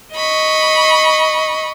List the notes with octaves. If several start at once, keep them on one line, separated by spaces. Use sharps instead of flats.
D#5 B5 C#6